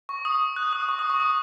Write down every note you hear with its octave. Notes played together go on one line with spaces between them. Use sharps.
C#6
D#6
F#6
D#6
C#6
D#6
C#6
D#6